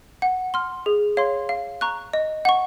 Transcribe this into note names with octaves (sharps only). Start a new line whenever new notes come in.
F#5
C6 F6
G#4
C#5 F5 C6
F5
A#5 C#6 F#6
D#5
F#5 C#6